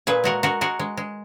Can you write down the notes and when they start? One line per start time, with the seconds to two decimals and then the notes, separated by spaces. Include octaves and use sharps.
0.07 A#2 G#4 B4
0.24 G#3 F#4 A#4
0.43 G#3 F#4 A#4
0.61 G#3 F#4 A#4
0.79 G#3
0.97 G#3